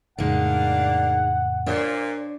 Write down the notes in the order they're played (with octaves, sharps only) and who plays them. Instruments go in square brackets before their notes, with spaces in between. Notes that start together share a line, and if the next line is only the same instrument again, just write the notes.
[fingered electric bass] F2 A2 C#3 [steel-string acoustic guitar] G#3 D#4 [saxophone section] A#3 D4 [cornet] F#5
[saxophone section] A#2 [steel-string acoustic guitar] D4 C5 C#5